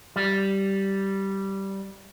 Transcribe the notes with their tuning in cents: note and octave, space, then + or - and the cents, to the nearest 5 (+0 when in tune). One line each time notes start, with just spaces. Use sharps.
G3 -10